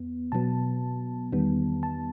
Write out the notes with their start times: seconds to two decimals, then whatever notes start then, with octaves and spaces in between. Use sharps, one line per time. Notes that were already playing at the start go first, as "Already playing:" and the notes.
Already playing: E2 B3
0.32 B2 F#3 B3 A5
1.32 E2 D#3 G3 B3
1.83 A5